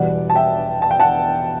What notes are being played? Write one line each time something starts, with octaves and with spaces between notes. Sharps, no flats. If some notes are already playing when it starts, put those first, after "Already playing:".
Already playing: E1 E2 B2 G3 D5 F#5
A5
E5 G5
A5
G5
F#5 A5